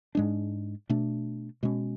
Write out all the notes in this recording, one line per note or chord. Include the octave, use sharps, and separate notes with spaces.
G#2 G#3 D4
B2 A3 D4
B2 G#3 C#4